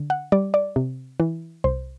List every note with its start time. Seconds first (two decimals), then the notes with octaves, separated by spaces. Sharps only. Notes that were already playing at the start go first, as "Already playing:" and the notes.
Already playing: D3
0.10 F#5
0.32 G3 D5
0.54 D5
0.76 C3
1.20 E3
1.64 C2 C5